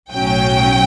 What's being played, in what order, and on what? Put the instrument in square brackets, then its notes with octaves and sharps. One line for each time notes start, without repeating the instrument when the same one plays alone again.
[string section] B1 A2 F#3 C#4 G5